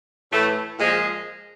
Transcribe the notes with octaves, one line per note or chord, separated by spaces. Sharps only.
A2 E3 A3
A#2 F3 G#3